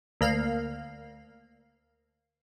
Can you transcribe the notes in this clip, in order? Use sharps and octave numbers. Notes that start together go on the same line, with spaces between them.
D2 A#3 F5